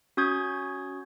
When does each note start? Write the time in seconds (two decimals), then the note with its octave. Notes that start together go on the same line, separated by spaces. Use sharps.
0.17 C#4 F#4 D#6 G6 G#6